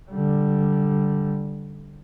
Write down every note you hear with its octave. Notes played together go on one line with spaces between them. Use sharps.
D3 G3